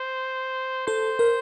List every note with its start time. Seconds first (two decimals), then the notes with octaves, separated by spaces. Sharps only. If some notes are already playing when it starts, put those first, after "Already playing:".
Already playing: C5
0.87 A4 C5
1.19 A#4